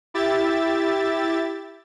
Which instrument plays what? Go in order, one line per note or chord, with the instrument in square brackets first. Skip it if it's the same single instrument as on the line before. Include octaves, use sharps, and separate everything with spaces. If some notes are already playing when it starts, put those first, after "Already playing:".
[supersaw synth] E4 G4 E5 A6